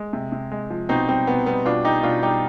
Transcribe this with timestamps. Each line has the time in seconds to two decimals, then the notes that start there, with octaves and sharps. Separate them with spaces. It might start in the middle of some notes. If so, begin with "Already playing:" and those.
Already playing: G#3
0.13 C3
0.32 C3
0.51 G#3
0.70 F3
0.89 B2 C4 D#4
1.08 G3 C4
1.27 B2 B3
1.46 G3 B3
1.65 B2 D4 F4
1.84 G3 D#4 G4
2.03 B2 D4 F4
2.23 G3 D#4 G4